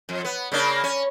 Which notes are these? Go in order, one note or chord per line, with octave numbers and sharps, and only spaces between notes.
F2
B3
C#3 A#3 D4
C#4